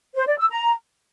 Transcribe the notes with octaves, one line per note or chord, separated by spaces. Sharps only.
C5
D5
E6
A#5